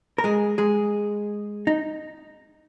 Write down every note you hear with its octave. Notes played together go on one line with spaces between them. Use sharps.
A#4
G#3 G#4
G#3 G#4
D#4